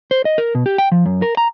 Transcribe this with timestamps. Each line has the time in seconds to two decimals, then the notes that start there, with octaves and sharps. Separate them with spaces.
0.11 C5
0.25 D#5
0.38 A#4
0.55 B2
0.66 G4
0.78 G5
0.92 F3
1.06 F#2
1.22 A#4
1.37 A#5